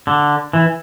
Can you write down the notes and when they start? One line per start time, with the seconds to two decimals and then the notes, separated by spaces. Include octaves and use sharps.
0.07 D3
0.53 E3